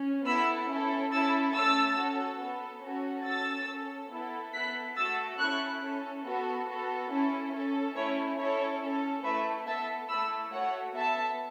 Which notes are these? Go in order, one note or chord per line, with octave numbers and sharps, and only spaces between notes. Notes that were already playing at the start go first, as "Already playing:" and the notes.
Already playing: C#4
B3 E4 A4 B5 E6
C#4 E4 A4
C#4 E4 A4 E6 A6
A3 C#4 A4 E6 A6
C#4 F#4 A4
B3 A4
C#4 F#4 A4
C#4 A4 E6 A6
C#4 A4
B3 E4 A4
B3 E4 A4 F#6 B6
A3 F#4 A4 E6 A6
C#4 E4 A4 C#6 F#6
C#4 A4
B3 F#4 A4
B3 F#4 A4
C#4 E4 A4
C#4 A4
A3 C#4 E4 C#5
C#4 E4 A4 C#5
C#4 A4
A3 E4 A4 B4 E5
B3 A4 E5 A5
A3 E4 A4 B5 E6
A3 F#4 A4 C#5 F#5
B3 A4 E5 A5